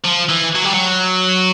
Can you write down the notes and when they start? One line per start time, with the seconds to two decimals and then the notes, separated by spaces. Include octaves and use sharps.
0.04 F3
0.29 E3
0.55 F#3
0.65 G3
0.74 F#3